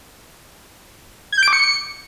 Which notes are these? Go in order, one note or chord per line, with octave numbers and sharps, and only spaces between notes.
G#6
G6
D7
D6
C#7